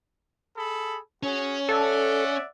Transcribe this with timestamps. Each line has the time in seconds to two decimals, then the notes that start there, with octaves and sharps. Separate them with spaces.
0.56 G#4 A4 B5
1.23 C#4 F#4 G#4 C#5
1.69 A4 D5 E5 F#5